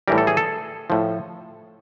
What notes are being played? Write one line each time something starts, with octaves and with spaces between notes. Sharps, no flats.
A2 E3 G3 A#4
A4
G#4
A4
A2 F3